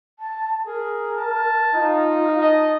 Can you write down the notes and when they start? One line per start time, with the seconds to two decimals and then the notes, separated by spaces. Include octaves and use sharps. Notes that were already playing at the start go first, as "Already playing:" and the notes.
0.19 A5
0.66 G#4 A#4
1.16 A5
1.74 D#4 F4
2.41 D#5 A5